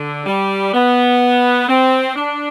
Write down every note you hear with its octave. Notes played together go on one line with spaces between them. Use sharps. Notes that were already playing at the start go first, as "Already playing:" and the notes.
Already playing: D3
G3
B3
C4
D4